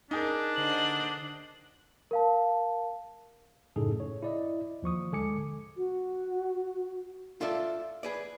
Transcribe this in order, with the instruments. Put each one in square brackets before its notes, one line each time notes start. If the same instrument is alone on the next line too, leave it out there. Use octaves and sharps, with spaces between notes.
[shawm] D4 [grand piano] D#4 G#4 A#4
[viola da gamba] D3 C5 D#5 [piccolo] F#7
[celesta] A#4 F5 A5
[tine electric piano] F#2 A2 C#3 D#4 G#4 A4
C#5
E4 D5 D#5
D#2 F3 C#6 D#6
D3 G#3 A4 G#5 D6 C#7
[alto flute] F#4
[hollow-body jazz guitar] F4 A4 D5 E5
G#4 B4 D5